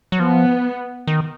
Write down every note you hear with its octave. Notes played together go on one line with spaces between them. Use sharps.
F#3
F3 B3
D#3